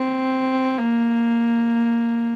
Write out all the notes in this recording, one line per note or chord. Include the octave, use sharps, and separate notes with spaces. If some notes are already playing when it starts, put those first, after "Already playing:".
Already playing: C4
A#3